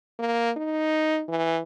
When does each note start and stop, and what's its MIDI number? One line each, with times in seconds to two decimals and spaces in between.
0.19 0.50 58
0.57 1.22 63
1.28 1.60 52